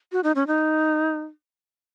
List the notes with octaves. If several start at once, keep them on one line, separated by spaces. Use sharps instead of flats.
F#4
D#4
C#4
D#4